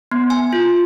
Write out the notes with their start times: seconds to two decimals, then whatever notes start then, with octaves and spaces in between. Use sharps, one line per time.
0.12 B3
0.30 G#5
0.53 F4